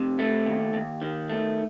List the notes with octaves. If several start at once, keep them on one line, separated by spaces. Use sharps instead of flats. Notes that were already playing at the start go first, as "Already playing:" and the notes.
Already playing: F2 C3
A3
D#2
D#2
D#3
A3